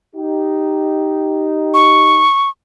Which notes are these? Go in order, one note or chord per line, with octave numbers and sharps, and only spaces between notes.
D#4 G4
C#6